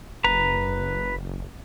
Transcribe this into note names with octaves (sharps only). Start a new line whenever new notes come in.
F#1 B4 A#5